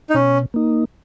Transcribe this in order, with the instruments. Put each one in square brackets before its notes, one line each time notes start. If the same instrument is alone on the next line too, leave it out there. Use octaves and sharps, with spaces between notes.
[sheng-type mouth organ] D#4
[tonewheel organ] B2 [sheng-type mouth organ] C#4
[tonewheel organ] A#3 D#4